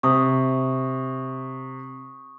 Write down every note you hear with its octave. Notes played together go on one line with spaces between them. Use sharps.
C3 C#6 D#6